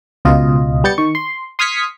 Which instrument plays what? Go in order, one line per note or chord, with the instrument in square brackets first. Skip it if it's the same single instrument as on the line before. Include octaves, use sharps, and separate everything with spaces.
[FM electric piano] C#2 B2 F4 D#5
G3 B3 G6 A6 C#7
D#3 C#6
C6
C6 D#6 F6 G#6 B6 C#7